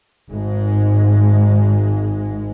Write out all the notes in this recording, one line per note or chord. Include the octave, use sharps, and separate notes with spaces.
G#1 G#2 G#3